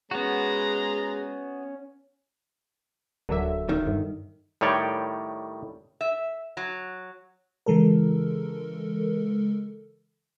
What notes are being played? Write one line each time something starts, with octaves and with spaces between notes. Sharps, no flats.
G#3 B3 C#4 F#4 A#5
D1 D3 F#3 A4 A#4 D5 E5
D#1 D#3
G2
A2 D#3 G3 C#5 D5 G5
E5
F#3
C#3 E3 G#3 A4 A#4